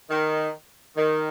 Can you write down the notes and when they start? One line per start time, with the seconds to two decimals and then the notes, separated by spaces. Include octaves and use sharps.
0.10 D#3
0.96 D#3